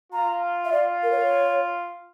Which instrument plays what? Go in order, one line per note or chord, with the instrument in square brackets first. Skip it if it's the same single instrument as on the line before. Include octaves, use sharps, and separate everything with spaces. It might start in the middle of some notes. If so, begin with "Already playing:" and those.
[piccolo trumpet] F4 [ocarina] A#5
[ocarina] E5
[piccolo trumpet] F4 [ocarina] D5
[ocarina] A#4
C#5